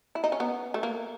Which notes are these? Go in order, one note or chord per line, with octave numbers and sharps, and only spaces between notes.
E4
D#4
C#4
B3
A3
A#3